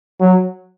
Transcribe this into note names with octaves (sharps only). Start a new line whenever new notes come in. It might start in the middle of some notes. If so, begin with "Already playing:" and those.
F#3